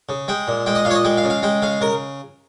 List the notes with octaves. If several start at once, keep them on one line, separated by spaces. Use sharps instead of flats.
C#3
G#3 G5
A#2
G#3 G5
D#5
A#2 F5
C#5
D#5
G#3 G5
F5
C#3
F5
G#3 G5
C#3 F5
C#3 A#4